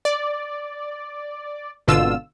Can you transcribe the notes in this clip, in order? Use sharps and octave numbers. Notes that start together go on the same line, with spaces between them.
D5
G#1 B2 D3 F4 E6